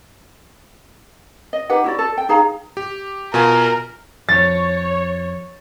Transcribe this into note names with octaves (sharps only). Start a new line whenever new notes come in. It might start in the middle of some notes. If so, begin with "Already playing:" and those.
D#5
D#4 G4 B4 F#5
E4 F#4 D5
A4
G5
D#4 G#4 F5 A#5
G4
B2 F4 A#4 G#5
F2 C#5 A6